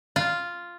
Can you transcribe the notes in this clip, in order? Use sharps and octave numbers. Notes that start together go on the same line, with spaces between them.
F4